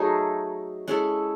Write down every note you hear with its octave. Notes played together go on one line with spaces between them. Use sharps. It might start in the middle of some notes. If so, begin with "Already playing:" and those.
Already playing: F#3 A3 D#4 G#4
G#3 C#4 E4 A4